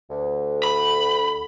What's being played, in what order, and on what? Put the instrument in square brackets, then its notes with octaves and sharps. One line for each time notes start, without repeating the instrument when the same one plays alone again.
[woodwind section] D2
[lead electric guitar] B5